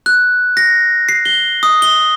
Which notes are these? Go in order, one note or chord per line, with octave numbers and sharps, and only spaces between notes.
F#6
A#6
C7
G7
D#6
G7